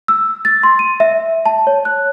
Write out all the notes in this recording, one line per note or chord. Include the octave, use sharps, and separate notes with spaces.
E6
A6
C6
D#7
E5
A5
C#5
F#6